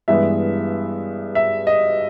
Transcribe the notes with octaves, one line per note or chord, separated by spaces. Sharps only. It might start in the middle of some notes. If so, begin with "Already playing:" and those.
G2 E3 G#3 B3 E5
E5
D#5